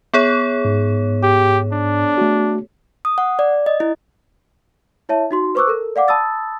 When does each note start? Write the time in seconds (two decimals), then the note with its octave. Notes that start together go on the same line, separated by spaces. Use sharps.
0.14 B3 G#4 C#5
0.65 G#2
1.23 G4
1.72 D4
2.18 A3 F#4
3.05 D#6
3.18 F#5
3.39 D5
3.66 D#5
3.80 E4
5.09 E4 C#5 E5 A5
5.31 D#4 F#4 C6
5.55 B4 C5 C#6 D6 E6 F#6
5.67 A4 A#4
5.96 D5 F5 F#5 D6
6.08 A5 B5 D#6 E6 A6